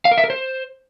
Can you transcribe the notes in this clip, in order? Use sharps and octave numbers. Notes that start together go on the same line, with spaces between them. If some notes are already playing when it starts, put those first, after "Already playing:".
F5
A#4
E5
A#4
C5